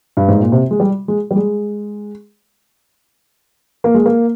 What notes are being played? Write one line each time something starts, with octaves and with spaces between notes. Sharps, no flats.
G2
G#2
A#2
C3
G#3
G3
G#3
G3
G#3
A#3
G#3
A#3